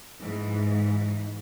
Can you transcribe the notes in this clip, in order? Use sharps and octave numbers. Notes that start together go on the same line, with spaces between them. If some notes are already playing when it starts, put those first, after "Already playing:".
G#2 E3